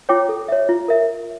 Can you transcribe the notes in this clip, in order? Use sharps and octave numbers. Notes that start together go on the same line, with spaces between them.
F4 C#5 G5 D6
A4
C#5 E5
F4
A#4 E5